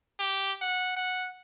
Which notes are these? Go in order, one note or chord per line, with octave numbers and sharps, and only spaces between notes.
G4
F#5
F#5